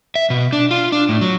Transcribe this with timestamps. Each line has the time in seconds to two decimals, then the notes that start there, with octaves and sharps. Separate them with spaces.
0.15 E5
0.30 B2
0.53 D4
0.71 F4
0.92 D4
1.09 A2
1.21 F#3